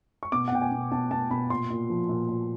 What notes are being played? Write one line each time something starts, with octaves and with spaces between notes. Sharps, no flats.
C#6
B2 D6
F#5
B2 G5
G#5
B2
B2 A5
B2 A5
B2 B5
A#2 C6
A#2
F3
A#2
A#2